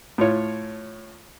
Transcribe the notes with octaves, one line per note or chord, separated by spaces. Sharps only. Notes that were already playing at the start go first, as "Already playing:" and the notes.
A2 F4 C#5